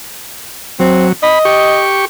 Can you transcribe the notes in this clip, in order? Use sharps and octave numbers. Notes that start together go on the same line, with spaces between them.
F#3 C4
D#5 B5
G4 C#6